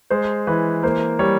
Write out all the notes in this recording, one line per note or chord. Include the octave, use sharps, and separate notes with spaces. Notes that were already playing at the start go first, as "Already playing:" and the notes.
G#3 C5
E3 B4
A#3 C5
G3 C#5